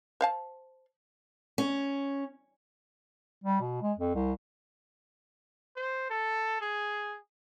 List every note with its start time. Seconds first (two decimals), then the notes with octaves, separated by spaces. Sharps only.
0.21 C5 F5 A5
1.58 C#4
3.44 G3
3.61 B2
3.82 G#3
3.98 F2
4.15 C2
5.76 C5
6.10 A4
6.61 G#4